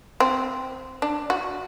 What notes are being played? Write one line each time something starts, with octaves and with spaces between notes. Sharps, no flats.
C4
D4
F#4